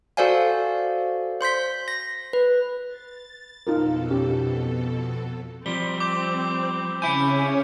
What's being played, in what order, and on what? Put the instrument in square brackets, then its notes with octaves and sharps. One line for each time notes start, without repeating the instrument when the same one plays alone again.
[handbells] F#4 A4 C5 D5 F5 G#5
C5 C6 G6 B6
A#6
B4
[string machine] A6
[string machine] F2 B2 A4 [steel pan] D#4 F4 A#4
[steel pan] C#4 G4
[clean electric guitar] F3 G3 [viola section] C4 [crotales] G7
[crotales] D6 G6
[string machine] C#3 C#4 C#5 [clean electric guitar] E4 G#5 [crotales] G6 C#7